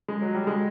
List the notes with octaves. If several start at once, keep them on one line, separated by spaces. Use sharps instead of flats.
G#3
F#3
G3
G#3